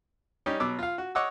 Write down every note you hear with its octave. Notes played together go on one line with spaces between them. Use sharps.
G3 C#4 D#4 G4
B2 F#3 D6 E6
F4 F5
F#4
C#5 D#5 F#5 D6 E6